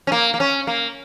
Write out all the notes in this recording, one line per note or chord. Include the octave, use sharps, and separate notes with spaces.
C#4
A#3
A#3
C#4
A#3